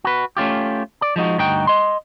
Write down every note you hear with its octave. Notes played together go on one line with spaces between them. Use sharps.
F#4 B4
A3 C#4 F4 G4
D5
F3 G#3 D#4 F#4
D2 G2 D#4 F#4 G5
D#5 C6